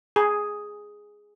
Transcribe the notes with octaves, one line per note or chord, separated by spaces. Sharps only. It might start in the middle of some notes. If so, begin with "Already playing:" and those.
G#4